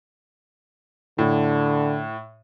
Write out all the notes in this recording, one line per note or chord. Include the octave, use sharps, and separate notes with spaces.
A2 D3